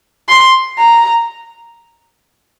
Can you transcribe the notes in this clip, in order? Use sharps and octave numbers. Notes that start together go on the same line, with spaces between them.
C6
A#5